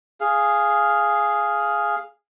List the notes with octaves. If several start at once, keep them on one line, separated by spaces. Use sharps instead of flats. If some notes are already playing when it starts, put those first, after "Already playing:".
G#4 F5